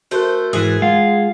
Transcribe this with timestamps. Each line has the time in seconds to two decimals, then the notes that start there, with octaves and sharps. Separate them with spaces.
0.11 A3 F#4 A#4 C5 F#6
0.53 G#2 E3 G#4
0.82 G#3 F4 F#5